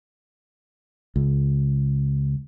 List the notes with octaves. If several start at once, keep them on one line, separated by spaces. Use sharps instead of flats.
C#2